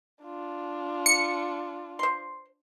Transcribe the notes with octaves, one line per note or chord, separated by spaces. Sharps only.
D4 F4
C#7
C5 C6